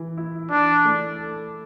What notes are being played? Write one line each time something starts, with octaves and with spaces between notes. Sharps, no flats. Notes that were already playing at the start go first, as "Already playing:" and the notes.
Already playing: E3
E4
E3 D4
A3
A4